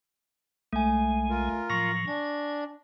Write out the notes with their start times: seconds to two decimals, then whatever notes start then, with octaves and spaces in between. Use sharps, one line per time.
0.73 B1 G#3 A3 G#5
1.30 F4 A#4
1.70 A2 F3 F#3 C#6 A#6
2.08 D4 G#5